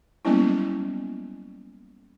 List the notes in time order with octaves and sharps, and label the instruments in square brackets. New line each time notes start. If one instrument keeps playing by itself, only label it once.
[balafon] F#3 G3 A#3 B3 C#4 E4